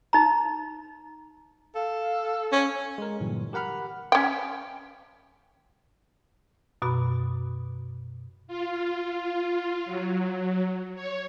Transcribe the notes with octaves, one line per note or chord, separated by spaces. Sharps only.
D#4 A#5
A4 F5
C#4
G#3 A#4
G2 A#2 D3 E3 F#3
G4 A#4 F#5 B5 F6
C#4 G5
F#2 B2 F#4 B5 D6
F4
F#3
C#5